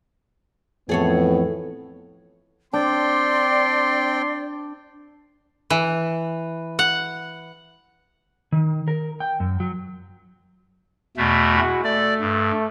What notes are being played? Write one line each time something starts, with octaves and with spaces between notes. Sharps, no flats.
F2 A2 E3 B3 G#4 A4 C#5
C4 D4 D5 G5 C6
E3
F#5
D#3
A#4
G5
F#2
F#3
E2 B2 A3
G#3 E4 F#4
A3 D5
G2